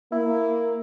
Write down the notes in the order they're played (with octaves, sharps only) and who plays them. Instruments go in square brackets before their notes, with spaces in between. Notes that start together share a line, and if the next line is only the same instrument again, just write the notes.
[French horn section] A#3 [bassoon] E4